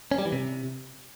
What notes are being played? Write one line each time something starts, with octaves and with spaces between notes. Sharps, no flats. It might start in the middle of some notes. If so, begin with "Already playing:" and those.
C#4
G3
E3
C3